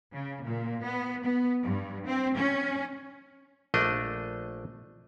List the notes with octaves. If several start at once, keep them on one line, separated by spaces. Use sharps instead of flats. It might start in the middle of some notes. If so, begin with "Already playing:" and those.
C#3
A#2
B3
B3
G2
C4
C#4
A#1 A3 D4 D#5